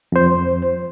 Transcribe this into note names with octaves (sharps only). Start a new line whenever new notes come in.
F2 C5